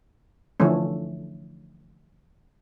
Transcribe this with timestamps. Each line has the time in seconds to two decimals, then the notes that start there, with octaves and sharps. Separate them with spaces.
0.60 D3 E3 F3 A3 C#4